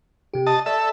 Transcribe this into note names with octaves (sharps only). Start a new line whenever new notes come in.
C3 G4
D#5 A5
A4 D5 E5 E6